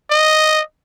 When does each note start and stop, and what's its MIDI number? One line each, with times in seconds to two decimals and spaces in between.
0.11 0.61 75